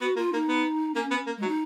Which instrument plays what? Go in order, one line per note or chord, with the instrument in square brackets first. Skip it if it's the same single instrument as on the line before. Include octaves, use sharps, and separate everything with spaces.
[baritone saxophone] B3 [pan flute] F#4
[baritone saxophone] A#3 [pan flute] F4
[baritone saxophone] A#3 [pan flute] D#4
[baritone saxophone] B3
[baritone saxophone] A#3 [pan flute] C#4
[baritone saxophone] B3 [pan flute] C#4
[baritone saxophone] A#3
[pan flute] G#3
[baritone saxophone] F#3
[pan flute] D#4